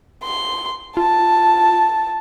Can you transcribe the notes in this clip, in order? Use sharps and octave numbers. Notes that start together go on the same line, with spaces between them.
C6
F4 A5